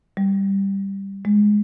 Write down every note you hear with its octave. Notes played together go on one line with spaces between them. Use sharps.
G3
G#3